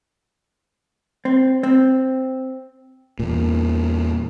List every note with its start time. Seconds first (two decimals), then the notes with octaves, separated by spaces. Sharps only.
1.25 C4
1.63 C4
3.19 E2 A#2